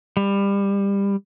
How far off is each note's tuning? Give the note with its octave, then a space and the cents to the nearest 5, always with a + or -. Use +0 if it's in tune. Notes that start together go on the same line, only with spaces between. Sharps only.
G3 +25